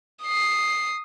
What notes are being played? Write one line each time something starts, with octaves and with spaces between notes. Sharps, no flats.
D#6 C7